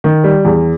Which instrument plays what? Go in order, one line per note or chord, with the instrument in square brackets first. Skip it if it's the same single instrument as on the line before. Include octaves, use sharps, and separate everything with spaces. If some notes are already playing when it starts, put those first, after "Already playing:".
[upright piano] D#3
G3
E2